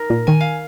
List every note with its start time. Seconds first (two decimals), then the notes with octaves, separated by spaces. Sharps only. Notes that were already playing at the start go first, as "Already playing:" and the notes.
Already playing: D#4 A#4 A#5
0.10 A#2
0.27 D#3 G#5
0.40 F5